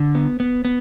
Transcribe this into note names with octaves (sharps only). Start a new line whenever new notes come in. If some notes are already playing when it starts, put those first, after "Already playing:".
Already playing: D3
B3
B3
B3